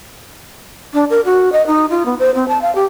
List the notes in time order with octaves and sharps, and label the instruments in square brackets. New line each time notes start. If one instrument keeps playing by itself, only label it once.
[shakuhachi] D4
A#4
F#4
D#5
D#4
F4
B3
C5
C4
A5
F5
G4